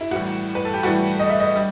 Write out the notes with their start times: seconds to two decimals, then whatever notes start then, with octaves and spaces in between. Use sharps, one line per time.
0.01 E4
0.11 A2 E3 G3 F#4
0.55 B4
0.65 A4
0.74 G4
0.83 A2 E3 G3 F#4
1.19 D#5
1.29 E5
1.40 D#5
1.56 G3